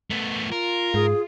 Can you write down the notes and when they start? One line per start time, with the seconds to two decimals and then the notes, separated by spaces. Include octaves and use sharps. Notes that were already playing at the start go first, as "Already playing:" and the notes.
0.10 A3 B3
0.52 F4 A#4
0.94 G#2 G#4